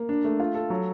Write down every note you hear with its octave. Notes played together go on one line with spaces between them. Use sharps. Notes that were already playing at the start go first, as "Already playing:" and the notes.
Already playing: A#3
D4
A3
F4
A4
F#3